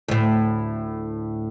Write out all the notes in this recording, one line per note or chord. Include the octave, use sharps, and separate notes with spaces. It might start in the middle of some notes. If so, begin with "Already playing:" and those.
D2 A2